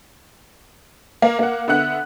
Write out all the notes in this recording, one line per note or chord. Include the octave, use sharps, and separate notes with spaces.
A#3
A#3 F#5
D3 B3 E5 F#5 F#6